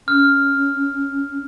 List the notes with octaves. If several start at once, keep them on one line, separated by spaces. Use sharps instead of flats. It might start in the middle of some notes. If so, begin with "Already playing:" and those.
C#4 F6